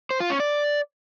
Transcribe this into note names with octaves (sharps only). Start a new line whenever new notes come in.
C5
F4
C#4
D5